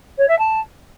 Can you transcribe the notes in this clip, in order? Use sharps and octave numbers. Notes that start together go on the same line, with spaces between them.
C#5
E5
A5